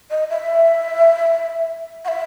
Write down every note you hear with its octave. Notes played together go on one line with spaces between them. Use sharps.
D#5
E5
F#5
E5